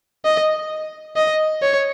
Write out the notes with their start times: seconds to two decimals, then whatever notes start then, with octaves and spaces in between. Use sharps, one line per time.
0.25 D#5
1.16 D#5
1.62 C#5